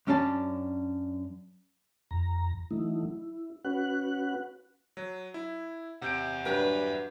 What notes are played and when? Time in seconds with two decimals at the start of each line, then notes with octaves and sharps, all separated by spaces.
0.07 F#2 C#4 D4 A#4 A5
2.11 F2 A#5
2.71 E3 F#3 A3 D#4 E4
3.09 E4
3.65 C#4 F#4 B4 F#5 F#6
4.97 F#3
5.34 E4
6.02 C3 E5 F#5 G6 D7
6.46 G2 F#3 G4 B4